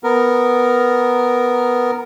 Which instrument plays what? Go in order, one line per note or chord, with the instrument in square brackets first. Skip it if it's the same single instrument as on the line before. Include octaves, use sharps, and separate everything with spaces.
[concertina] B3 A#4